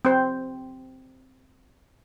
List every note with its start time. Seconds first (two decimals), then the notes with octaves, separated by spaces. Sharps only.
0.05 C4 C5